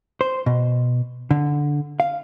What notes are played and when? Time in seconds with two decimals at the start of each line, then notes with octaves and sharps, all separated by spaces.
0.21 C5
0.46 B2
1.31 D3
2.00 F5